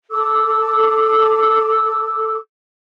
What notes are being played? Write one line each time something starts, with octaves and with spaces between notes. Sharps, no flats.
A4 D6 E6